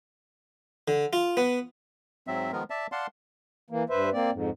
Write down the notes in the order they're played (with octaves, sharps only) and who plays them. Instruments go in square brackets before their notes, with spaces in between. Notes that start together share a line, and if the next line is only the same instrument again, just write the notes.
[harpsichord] D3
F4
B3
[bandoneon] G#2 F#3 C4 E5
D#3 F3 G#3 B3 A#4
D5 E5 A5
D5 F5 F#5 A5 C6
[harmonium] E3 A#3
G2 B4 C5 E5
A#3 C4 D5
F2 G#2